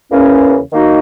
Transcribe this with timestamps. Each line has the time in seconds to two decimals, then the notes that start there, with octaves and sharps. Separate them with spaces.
0.09 E2 C#3 E3 A#3 C#4
0.72 D#3 A#3 D#4 F#4